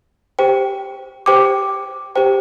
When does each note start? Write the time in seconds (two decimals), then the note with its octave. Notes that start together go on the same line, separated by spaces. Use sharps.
0.39 G4 C5 G5
1.26 G4 C5 G5 D6
2.15 G4 C5 G5